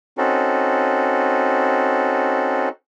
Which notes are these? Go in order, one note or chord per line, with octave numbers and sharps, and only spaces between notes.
C4 C#4 D#4 F#4 A4